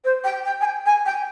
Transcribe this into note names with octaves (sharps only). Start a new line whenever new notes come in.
C5
G5
G5
G#5
G5
G#5
G5